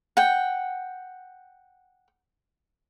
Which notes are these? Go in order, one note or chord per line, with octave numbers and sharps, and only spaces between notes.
F#5 G5